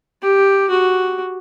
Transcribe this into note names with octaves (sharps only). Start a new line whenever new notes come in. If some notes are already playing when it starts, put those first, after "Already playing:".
G4
F#4